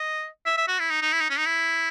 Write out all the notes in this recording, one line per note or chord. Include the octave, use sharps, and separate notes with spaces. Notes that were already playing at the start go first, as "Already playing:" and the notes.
Already playing: D#5
E5
E5
F#4
E4
D#4
D#4
E4
D#4
C#4
D#4
E4